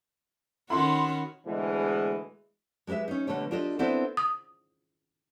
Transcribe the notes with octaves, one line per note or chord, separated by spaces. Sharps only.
D#3 C#4 F#4 B5 C6
D2 B2 E3 G#3
G#3 G4 A#4 B4 E5
C#4 D#4
B2 D3 G3 A3 C#5
D4 F4 G4 A4 D#5
B3 C4 D4 E4 A4 C5
D#6